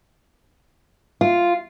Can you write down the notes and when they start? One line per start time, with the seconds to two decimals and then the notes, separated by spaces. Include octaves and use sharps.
1.21 F4